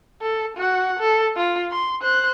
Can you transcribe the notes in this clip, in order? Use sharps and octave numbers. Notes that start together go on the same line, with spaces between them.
A4
F#4 F#5
A4
F4
C6
C5 F#6